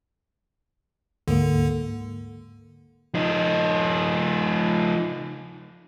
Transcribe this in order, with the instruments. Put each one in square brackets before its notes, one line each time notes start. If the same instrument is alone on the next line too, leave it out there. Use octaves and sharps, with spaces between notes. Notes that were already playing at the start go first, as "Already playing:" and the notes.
[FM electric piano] D2 G#2 A#3 [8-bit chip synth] D3
[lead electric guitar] F3 D#4